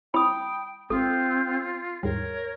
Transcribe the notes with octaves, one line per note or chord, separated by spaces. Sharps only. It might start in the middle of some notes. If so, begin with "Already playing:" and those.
C4 E4 C#5 G5 B5 D#6
G#1 C4 F4 A4
D#2 G#2 G3 A#4 C#5